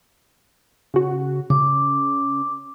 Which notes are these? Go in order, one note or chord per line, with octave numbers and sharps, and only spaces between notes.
C#3 F#4
C#3 D6